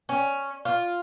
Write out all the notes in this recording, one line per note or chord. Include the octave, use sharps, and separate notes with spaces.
C#4
F4